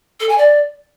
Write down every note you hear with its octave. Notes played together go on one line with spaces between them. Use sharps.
A4
G#5
D5